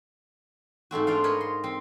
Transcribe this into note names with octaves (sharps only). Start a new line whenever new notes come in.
G#2 A3 C4 F#4
D4 F4 D5 F5
A#4 C#5 D#5 B5
C6
C4